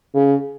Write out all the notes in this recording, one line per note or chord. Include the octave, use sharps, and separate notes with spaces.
C#3